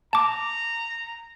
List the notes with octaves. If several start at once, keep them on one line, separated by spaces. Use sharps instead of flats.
A5 A#5 D6